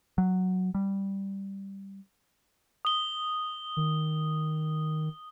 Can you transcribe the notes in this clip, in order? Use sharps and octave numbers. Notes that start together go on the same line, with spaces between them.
F#3
G3
D#6 G7
D#3